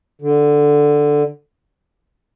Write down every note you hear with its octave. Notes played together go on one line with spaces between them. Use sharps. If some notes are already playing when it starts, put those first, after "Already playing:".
D3